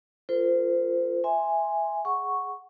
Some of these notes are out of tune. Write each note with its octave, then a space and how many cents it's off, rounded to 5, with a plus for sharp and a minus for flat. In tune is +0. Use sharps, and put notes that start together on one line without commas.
F4 -10 A4 +45 C5 -30
E5 +0 G#5 -10 C6 +0
G#4 +0 F#5 +0 C#6 +0